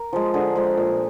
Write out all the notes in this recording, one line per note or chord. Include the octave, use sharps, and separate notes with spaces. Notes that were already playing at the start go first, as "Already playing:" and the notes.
Already playing: A#4
F3 G#3
D3 G#4
F3 G#3
A#2